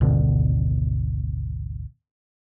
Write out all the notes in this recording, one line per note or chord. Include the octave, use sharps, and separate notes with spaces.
G#1 D2 B2 D3